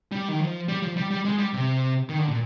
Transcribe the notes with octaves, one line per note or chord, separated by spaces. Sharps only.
G3
D#3
F3
G3
F3
G3
G3
G#3
G3
C3
D#3
D3
A#2